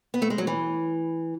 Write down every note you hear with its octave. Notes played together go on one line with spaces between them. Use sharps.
B3
A3
G#3
F#3
E3